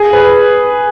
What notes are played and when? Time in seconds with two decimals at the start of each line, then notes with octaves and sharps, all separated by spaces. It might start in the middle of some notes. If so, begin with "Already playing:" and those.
Already playing: G#4
0.13 B4